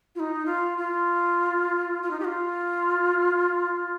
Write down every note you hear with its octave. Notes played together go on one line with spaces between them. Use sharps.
F4
D#4
F4
F4
F4
D#4
G4
F4